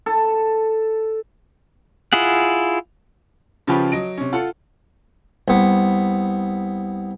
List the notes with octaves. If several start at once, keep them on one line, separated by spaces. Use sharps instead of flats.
A4
E4 F4 G#4 F#5
C#3 F3 C#4 F4 G4 B4
F#3 D#5 D7
C3 C#4
F4 A4 F#5
C2 B3